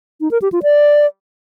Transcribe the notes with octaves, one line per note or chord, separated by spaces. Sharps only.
D#4
A#4
G4
F4
D5